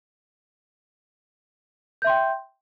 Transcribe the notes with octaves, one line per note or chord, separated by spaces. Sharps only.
E5 G5 C6 G6